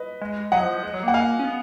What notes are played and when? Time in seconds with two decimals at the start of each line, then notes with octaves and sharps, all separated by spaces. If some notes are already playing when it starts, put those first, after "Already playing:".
Already playing: B4 D#5
0.21 G#3
0.52 F#3 D#5 F#5
0.63 F3
0.73 F3
0.83 G#3
0.94 F#3
1.03 A#3 F#5
1.14 F5 G#5
1.39 C#4
1.45 B3